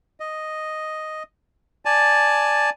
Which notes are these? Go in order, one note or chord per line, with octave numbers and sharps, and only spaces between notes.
D#5
D5 G#5 A5